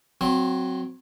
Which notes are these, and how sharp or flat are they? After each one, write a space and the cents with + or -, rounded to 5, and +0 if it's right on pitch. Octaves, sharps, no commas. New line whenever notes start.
F#3 +0 C4 -10 C6 +45